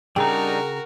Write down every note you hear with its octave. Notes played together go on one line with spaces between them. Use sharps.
C#3 G3 D4 D#4 F#4 A#4 G5 A#5